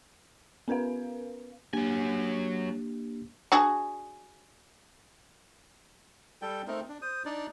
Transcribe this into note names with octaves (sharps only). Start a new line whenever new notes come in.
B3 C#4 A#4 B4 F5
F#3 A#3 D4 G4 G#5
D4 F#4 G#4
G3 A4 G5
A3 C4 D#4 A#4
D4
C5 D#6
D4 D#4 D5